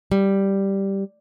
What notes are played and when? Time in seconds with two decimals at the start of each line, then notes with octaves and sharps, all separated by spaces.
0.12 G3